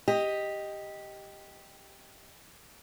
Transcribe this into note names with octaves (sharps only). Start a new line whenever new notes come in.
G4 D#5